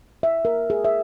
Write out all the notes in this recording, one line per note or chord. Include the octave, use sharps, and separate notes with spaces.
E5
A#4
G#4
E5